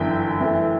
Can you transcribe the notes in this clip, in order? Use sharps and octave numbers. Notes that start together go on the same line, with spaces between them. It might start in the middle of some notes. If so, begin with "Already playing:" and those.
Already playing: G1 F#2 E3 G5
F#2 E3 A3